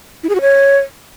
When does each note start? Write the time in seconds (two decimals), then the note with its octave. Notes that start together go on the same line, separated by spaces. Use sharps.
0.23 E4
0.29 G#4
0.35 F#4
0.41 C#5